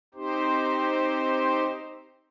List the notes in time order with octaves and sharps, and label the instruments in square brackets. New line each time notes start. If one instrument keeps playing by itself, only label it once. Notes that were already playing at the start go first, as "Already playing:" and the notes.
[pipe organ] C4 D#4 G4 C5